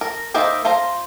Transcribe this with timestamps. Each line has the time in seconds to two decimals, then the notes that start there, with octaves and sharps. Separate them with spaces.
0.01 A#4
0.34 A#3 D#4 E4 A#4 C5
0.65 F4 C5 F5 A#5